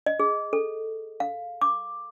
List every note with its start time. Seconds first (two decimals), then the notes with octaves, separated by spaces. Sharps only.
0.06 D#5
0.20 G#4
0.53 A4
1.20 F5
1.62 D6